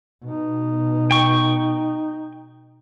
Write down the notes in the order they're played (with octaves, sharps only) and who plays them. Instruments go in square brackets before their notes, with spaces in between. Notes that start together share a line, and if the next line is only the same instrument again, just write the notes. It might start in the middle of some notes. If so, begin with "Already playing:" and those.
[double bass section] B2 [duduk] D#4
[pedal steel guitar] G5 C#6